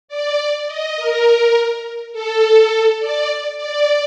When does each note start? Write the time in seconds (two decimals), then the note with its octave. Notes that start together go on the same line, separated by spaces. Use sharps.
0.08 D5
0.37 D5
0.67 D#5
0.97 A#4
2.13 A4
2.71 A4
3.00 D5
3.57 D5